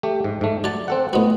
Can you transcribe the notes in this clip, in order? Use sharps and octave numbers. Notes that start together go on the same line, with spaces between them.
A3 G4
G#2
G#2 A3
F#3 D5 A5
C4 A4 F#5
A2 B3 F#4 D#5